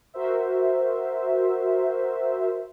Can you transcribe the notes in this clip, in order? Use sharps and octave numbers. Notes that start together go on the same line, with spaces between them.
F#4 A#4 C5 E5